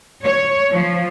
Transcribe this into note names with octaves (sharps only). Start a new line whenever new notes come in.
C#5
F3